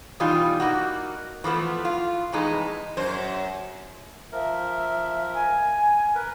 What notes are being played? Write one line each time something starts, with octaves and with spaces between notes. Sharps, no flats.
B2 E3 G3 D#4 F4
A#3 D#4 F#4
E3 F3 A3 B3
F4
F2 A2 E3 G#3 D#4
F#2 C5
F3 A#4 E5
G#5
A#4 B4